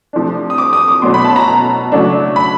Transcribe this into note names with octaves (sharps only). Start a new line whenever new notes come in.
C3 F3 A3 D4
D#6
D6
D#6
D6
B2 F#3 A3 C#4 C6
B5
A5
A#5
C#3 F#3 A3 D4
B5